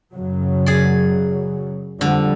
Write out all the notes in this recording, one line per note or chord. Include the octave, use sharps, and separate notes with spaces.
F#2 C#3 F#3
G#4 D5
F2 D3 F3 G3